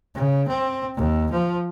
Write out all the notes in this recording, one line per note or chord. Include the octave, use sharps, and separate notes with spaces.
C#3
C4
D#2
F3